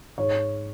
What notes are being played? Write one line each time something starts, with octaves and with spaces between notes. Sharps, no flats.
G#2 C#5